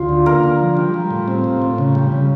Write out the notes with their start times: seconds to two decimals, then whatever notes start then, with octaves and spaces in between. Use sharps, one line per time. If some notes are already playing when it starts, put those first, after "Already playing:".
Already playing: D2 F4
0.09 D3
0.26 A#3 A#4
0.43 D3
0.61 F3
0.77 G3
0.94 G3
1.10 A2
1.28 C4
1.44 A2
1.62 A2
1.78 C#3
1.95 G3
2.12 C#3